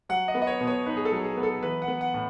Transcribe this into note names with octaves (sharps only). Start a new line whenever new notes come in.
F#3 F#5
D#5
B3
D#5
C#5
B2
C#5
D#4 B4
G#4
A4
F#3
G#4
B3
A4
E3 B4
F#5
B3
F#5
A2